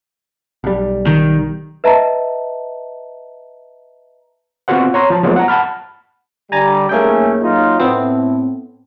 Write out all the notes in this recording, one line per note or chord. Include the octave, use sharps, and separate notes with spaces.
B1 G3
D#3
B4 D#5 E5 A5 A#5
B3 C4 F4 F#4 C5 F#5
C#5 A#5 C6
F3 A5
F3 F#3 G#3 A3 B3
F#5 A#5
F#5 A5 B5 F6
D3 G3 G#5 A#5 A6
B1 A3 A#3 C#4 G#4 G5
F#3 D#4 F4
A2 B3 C4